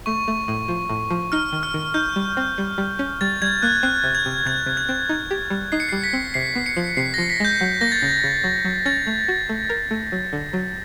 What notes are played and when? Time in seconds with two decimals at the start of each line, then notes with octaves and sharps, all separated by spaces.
0.06 A3 C#6
0.28 A3
0.48 A2
0.68 F3
0.90 A2
1.10 F3
1.32 D#4 F6
1.52 D#3
1.63 F6
1.74 D#3
1.94 D#4 G6
2.16 G3
2.37 C4
2.58 G3
2.78 G3
2.99 C#4
3.21 G3 A6
3.42 G3 G#6
3.62 A#3 F#6
3.83 C4 F#6
4.04 C3
4.15 G#6
4.26 C3
4.46 C3 G#6
4.67 C3
4.77 G#6
4.89 C4
5.09 D#4
5.31 G4
5.50 G3
5.72 D#4 C7
5.80 C#7
5.89 G3 C7
6.04 B6
6.13 C4
6.34 C3 C7
6.55 B3
6.66 C#7
6.77 F3
6.97 C3 C7
7.14 F3 A#6
7.30 B6
7.40 G#3 G6
7.60 F#3 G6
7.81 A#3 A#6
7.92 A6
8.02 C#3
8.24 C#3
8.44 F#3
8.65 F#3
8.86 C#4 A6
9.07 A3
9.28 F#4
9.49 A3
9.70 A#4
9.91 A3
10.12 F#3
10.33 D3
10.53 F#3